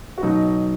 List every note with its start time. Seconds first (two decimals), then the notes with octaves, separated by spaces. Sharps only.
0.18 F#4
0.23 B2 F#3 D#4